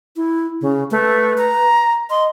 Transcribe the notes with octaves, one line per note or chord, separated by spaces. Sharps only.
E4
C#3
A3 B4
A#5
D#5 C6